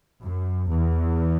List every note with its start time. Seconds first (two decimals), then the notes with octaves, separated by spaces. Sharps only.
0.23 F#2
0.71 E2